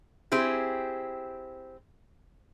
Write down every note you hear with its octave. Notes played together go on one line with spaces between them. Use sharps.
C4 E4 G4 G#4